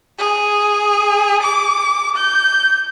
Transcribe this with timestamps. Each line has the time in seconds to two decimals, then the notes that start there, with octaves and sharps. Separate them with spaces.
0.19 G#4
1.43 D6
2.16 G6